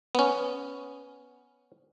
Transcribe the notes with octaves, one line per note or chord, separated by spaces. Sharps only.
B3 C#4